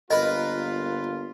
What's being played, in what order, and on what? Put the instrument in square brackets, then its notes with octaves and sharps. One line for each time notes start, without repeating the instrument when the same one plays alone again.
[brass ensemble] G1 A#3 F4 [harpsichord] A#4 B4 [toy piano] D#5